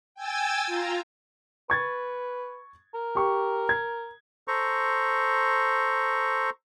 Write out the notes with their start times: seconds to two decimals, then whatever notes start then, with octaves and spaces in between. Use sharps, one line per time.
0.15 G5 G#5 E6 G#6 A6
0.66 F4 A#5
1.70 B4 C#6 G#6 A6
2.94 A#4
3.15 G4 C#6
3.69 G#6
4.48 A4 C5 A#5 C#6